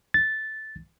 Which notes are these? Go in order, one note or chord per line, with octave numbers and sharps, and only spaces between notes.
A6